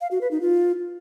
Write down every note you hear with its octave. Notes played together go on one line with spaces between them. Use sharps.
F5
F#4
B4
D#4
F4